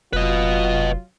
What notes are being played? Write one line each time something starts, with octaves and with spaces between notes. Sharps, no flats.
F1 F#3 F4 B4 D#5